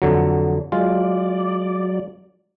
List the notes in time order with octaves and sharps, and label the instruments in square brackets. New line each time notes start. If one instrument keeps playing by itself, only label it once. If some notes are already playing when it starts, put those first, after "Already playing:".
[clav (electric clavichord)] F2 D3 F#3
[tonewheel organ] F#3 D5 [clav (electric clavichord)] G#3 F4